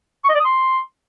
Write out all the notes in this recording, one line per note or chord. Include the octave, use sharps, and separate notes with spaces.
C#6
D#5
D5
D#6
C6